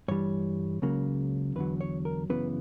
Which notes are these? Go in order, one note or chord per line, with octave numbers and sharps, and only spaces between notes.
G2 E3 G3 C#5
C#2 C#3 F#3 A#3
E2 D3 F#3 B4
C#5
A#4
F#2 C#3 E3 B3 B4